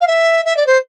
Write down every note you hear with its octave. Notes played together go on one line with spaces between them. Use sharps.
F5
E5
E5
D5
C5